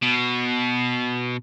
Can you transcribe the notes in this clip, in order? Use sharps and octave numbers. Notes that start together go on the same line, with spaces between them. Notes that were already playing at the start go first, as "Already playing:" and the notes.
B2